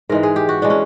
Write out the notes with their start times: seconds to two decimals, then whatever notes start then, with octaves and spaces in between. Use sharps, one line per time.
0.09 G#2 E3 G#3 A#4
0.23 G#4
0.36 G4
0.49 F#4
0.62 E3 G#3 D4
0.70 C#4